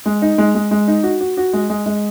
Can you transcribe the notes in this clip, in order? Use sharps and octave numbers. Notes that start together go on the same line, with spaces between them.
G#3
D#4
G#3
G#3
G#3
D#4
F#4
F#4
F#4
G#3
G#3
G#3